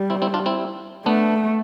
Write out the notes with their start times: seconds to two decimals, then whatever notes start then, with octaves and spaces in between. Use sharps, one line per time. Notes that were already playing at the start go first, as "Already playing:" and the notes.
Already playing: G3
0.10 C4 E4
0.22 C4 E4
0.34 D4 F4
0.46 C4 E4
1.05 A3 B3 D4